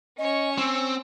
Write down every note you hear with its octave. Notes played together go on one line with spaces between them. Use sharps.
C#4 C#5 D#5
C4 E6